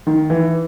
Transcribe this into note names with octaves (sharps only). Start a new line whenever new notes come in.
D#3
E3